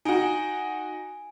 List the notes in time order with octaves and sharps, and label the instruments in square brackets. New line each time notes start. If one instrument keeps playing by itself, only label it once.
[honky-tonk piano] D#4 F#4 [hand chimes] G#5 D7